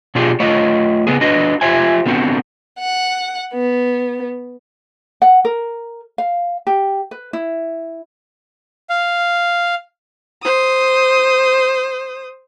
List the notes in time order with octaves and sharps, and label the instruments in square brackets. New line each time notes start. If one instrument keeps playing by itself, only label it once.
[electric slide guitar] B2 D4 F4 G4 G#4
A3 F4 C#5 D#5
C#3 B3 G#4
D4 F#4 B4 D#5
F4 G4 C5 E5 G#5
D3 B3 C4 F#4
[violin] F#5
B3
[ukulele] F#5
A#4
F5
G4
B4
E4
[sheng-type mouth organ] F5
[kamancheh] C5 D#6